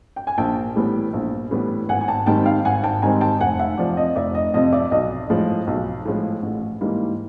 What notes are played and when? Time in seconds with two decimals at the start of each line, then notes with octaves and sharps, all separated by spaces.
0.16 G5
0.27 G#5
0.38 A#1 G5 A5
0.76 A2 E3 G3 B3
1.13 A#1
1.51 A2 E3 G3 B3
1.89 G#1 F#5 G#5
2.01 G#5
2.08 G5 A5
2.26 G#2 D#3 G3 C4 G5 A5
2.46 F5 G5
2.65 G#1 F#5 G#5
2.84 G5 A5
3.02 G#2 D#3 G3 C4 G#5 A#5
3.21 G5 A5
3.40 F1 F#5 G#5
3.59 E5 F#5
3.78 F2 C3 F3 D5
3.97 D#5
4.16 F1 D5 E5
4.35 D#5
4.54 F2 C3 F3 D#5
4.73 D5 E5
4.91 B1 D#5
5.30 A2 F3 G#3
5.67 B1
6.05 A2 F3 G#3
6.43 A1
6.81 G#2 E3 G3 A#3